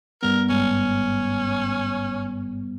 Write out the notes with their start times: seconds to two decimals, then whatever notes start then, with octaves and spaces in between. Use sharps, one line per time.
0.23 G2 G3 B3 A#4
0.50 G#1 G#2 C#4